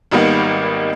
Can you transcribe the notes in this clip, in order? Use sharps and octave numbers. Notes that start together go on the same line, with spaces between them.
G#1 D#3 G3 A#3 B3 D#4